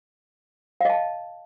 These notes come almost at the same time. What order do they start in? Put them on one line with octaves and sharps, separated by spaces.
F5 D#5 A5